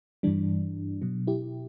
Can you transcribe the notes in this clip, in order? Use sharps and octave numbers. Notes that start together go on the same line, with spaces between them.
G2 E3 G3 D4
B2 F#3
E4 G4